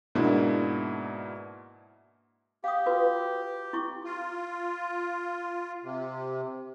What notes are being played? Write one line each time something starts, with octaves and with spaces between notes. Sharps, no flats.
G#2 B2 A#3 D4 E4
G4 F5 D#6
F4 F#4 B4
E4 C#6
F4
C3